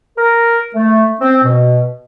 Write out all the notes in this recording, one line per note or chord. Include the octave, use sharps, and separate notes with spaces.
A#4
A3
C4
B2